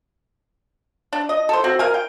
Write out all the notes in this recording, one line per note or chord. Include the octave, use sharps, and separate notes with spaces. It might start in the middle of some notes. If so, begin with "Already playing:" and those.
D4
D#5
A4 C5
C4 F#4
A#4 F5 G#5
G5